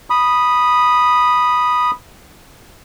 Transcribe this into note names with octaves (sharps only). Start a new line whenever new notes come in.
B5 D#6